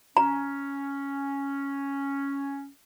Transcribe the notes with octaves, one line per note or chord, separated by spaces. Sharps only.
C#4 A#5